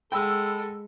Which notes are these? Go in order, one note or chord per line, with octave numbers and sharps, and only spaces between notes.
G#3 A4 F#5 G5 B5 E6